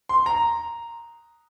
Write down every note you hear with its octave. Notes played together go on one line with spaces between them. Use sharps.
C6
A#5